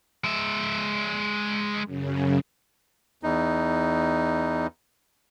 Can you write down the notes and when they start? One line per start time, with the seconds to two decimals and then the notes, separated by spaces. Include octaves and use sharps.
0.24 G#3 E5
1.84 F#2 C#3
3.23 E2 D#4